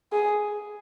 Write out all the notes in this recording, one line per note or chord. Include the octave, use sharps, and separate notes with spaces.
G#4